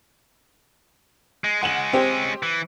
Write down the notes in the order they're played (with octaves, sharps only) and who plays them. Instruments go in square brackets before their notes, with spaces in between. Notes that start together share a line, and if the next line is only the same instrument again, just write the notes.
[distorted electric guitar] G#3
[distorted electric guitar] G#3 C#4 [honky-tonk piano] F#5 E7 F#7
[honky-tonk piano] C4 G4 C5
[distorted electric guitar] E3